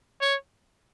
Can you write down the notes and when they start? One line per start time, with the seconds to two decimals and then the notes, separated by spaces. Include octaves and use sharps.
0.21 C#5